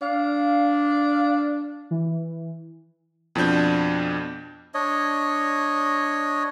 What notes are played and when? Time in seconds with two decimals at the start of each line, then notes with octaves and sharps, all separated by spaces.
0.02 D4 F5
1.91 E3
3.35 F2 B2 F3 D4 G6
4.74 D4 C#5 D#5